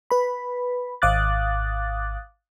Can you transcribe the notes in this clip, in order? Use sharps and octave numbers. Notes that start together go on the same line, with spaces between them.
B4 B5
G#1 F5 D6 D#6 F#6 A6